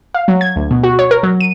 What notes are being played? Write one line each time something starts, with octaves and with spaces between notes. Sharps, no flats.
F5
F#3
G#6
D2
B2
F#4
C#5
A#4
F#3
D#7